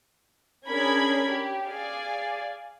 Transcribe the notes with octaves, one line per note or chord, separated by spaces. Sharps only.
C#4 D4 G#4 A#4 B5 G#6
G4
G#4 D5 F5 G#5